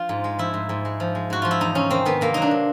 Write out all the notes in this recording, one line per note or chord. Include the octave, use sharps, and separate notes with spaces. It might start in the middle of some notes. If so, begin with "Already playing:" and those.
Already playing: F3 F4
G#2
G#3
F3 E4
G#2
G#2
G#3
F3
G#3
G#2 F#4
F3 F4
E4
E2 D#4
C3 C#4
D#3 C4
D#3 B3
C3 A#3
F#3 D#4
D4
C3